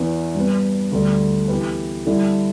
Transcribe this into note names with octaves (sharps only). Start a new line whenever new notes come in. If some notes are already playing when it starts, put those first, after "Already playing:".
Already playing: E2 E3 B3
G2 G3 B3
D2 D3 G3 D4 A4
E3 B3 G4 B4
D3 G3 E4 A4